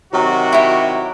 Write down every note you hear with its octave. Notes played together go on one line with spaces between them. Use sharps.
C3 D#3 F#3 F#4
E4 G4